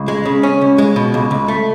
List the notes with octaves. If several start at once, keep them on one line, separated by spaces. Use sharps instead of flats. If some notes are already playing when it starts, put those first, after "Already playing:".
Already playing: C#2
G#3
C#3
C#4
C#2
G#3
B2
C#2
C#2
A3